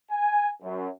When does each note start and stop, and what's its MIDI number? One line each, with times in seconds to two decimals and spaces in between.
0.10 0.49 80
0.62 0.88 42